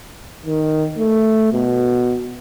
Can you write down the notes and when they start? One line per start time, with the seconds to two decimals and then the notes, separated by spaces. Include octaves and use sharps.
0.46 D#3
0.98 A3
1.53 B2